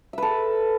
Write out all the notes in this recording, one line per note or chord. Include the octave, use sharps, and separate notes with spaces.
A4 B4 E5